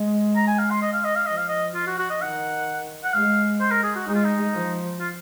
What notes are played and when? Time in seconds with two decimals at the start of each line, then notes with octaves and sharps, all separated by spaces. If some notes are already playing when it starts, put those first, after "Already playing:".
Already playing: G#3
0.36 A#5
0.47 G#5
0.59 F5
0.70 C6
0.82 D#5
0.93 F5
1.04 D#5
1.15 F5
1.26 F3 D#5
1.37 F5
1.48 D#5
1.75 F4
1.87 F#4
1.98 F#4
2.10 D#5
2.21 D#3 F#5
3.04 F#5
3.13 G#3 F5
3.60 C5
3.72 A#4
3.83 G#4
3.96 F#4
4.07 G#3 D#4
4.15 F4
4.24 D#4
4.53 F3
5.00 F4